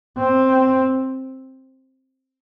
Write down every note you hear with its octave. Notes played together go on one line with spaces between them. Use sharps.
C4